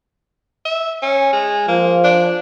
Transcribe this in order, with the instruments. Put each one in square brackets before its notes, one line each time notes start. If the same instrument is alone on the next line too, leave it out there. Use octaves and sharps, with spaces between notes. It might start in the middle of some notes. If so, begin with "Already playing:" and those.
[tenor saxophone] E5
C#4
G#3
[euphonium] F3 [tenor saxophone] A#3
[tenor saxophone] D4